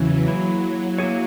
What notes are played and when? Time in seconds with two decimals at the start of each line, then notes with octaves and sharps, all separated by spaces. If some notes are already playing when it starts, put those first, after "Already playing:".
Already playing: E2 C#3 E3 F#3 C#4
0.27 F#3 A#3 E4 G#4
0.98 A#3 E4 G#4 C#5